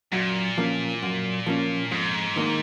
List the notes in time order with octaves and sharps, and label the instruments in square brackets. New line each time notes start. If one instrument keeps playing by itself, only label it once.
[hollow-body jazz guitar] F#2 [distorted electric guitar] A#2
[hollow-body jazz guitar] F3 A#3 C#4
F#2
F3 A#3 C#4
[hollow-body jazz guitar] F2 [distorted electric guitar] G#2
[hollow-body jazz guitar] D#3 A#3 D#4